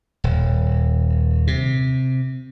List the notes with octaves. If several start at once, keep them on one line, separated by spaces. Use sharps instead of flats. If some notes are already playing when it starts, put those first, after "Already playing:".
D#1
C3